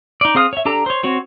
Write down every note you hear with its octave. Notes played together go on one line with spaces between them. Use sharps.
D#4 D5
C4 G#4 F5 D#6 F6
C#5 E5
D4 G4 A4 A#5
C5 C#5
C4 F#4 C#5